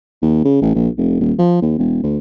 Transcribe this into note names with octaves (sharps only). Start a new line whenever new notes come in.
D#2
C#3
A1
A#1
F1
D#1
F3
D#2
E1
D2